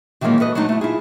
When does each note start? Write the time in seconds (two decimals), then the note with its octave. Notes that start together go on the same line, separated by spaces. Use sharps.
0.21 D#3 E3 F#3 G#3 A#3 C#4
0.40 A4 B4 D#5
0.55 F#3 G#3 A3 D#4
0.69 A3 E4
0.81 E4 F4 G#4